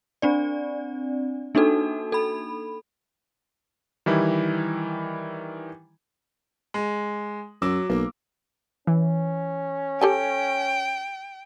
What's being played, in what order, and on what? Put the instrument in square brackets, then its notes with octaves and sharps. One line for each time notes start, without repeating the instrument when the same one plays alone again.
[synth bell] C4 D4 D5
A#3 D4 D#4 F#4 A4
A4 B5
[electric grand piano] D#3 E3 G3 E4
[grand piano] G#3
[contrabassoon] F#2 [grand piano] F#3 D6 E6
[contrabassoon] B1 [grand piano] A#3
[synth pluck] E3 [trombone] C#4
[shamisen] G4 A4 G#5 [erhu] G5